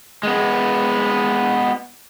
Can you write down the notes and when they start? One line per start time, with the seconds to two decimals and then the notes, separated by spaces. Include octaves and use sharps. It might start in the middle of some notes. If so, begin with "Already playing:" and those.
0.23 G#3 B3